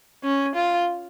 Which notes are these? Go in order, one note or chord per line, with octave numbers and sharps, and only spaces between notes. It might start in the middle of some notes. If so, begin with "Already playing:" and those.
C#4
F4